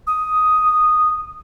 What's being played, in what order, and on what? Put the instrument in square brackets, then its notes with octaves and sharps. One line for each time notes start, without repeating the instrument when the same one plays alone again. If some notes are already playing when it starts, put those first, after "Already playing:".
[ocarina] D#6